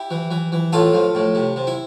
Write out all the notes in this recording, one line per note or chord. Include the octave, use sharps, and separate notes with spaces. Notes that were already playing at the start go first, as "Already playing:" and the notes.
Already playing: E4 G4
E3
E3
E3
A2 F4 A4
F3
A2
C3
C3
E4